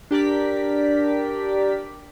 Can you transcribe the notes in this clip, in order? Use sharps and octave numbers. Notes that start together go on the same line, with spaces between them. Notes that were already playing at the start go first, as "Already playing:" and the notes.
D4 G4 A#4 D5 B6